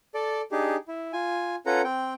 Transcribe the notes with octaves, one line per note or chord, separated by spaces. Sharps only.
A4 D5
D4 D#4 G4 G#4
E4
F4 G#5
C#4 F4 A4 B4 F#5 A#5
C4 G5